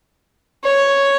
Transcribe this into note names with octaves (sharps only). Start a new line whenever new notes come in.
C#5